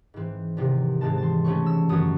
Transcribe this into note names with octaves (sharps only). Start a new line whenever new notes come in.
G#2 E3 C4
E2 C3 D#3
G#2 E3 G#3 C4 A5
A5
C6
C#3 E3 A3 C#4 C#6
E6
F#2 D#3 F#3 C#4 D#6